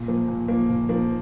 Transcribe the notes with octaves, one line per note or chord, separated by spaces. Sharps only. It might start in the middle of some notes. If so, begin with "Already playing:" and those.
Already playing: A#2
F3 A#3
A#2
F3 A#3
A#2
F3 A#3